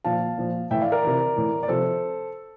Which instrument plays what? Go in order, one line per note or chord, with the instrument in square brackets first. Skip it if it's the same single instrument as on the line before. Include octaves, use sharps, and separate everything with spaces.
[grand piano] A#2 F3 F5 A5
A#2 F3
A2 E3 E5 G5
D5 F5
A#4 D5
C3 E3
A2 E3
D5
C3 F3 A4 C5